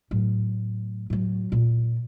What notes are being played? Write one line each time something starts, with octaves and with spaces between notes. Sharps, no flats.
A2 F#3
A2 F#3
A#2